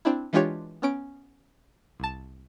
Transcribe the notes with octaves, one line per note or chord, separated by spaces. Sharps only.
C4 D4 E4
E3 G#3 D4 F4 G4 C#5
B3 C#4 D7
C2 A5